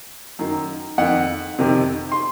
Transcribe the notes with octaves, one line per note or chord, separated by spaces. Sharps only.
F#2 D#3
F2 D#3 F#5
F2 C3 D#3
C6